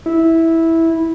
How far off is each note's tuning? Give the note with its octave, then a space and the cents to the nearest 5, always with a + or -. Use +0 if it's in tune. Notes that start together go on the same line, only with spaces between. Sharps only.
E4 -10